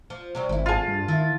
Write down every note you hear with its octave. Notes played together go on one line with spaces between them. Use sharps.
F3
C3 F#3 G3
G#1 F2 E4
F4 G#4 F5 A5
G2
D#3 E4